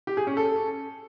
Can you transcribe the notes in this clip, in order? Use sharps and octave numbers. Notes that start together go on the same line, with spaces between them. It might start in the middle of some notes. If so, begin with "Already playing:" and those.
G4
G#4
C#4
A4